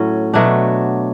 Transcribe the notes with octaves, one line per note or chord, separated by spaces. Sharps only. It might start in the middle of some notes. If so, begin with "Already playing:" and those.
Already playing: A2 F#3 C#4
B2 F#3 A3 D4